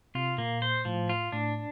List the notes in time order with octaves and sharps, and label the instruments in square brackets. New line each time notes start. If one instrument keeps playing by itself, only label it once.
[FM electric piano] C3 [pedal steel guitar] F4
[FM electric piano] A#2 [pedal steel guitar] A#3
[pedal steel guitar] C5
[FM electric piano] A2 [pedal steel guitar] F3
[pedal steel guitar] F4
[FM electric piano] A2 [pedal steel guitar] D4